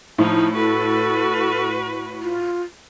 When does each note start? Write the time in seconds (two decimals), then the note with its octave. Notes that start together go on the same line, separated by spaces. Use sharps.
0.18 A2 F3 D#4
0.56 F#4 A4 B4
2.22 F4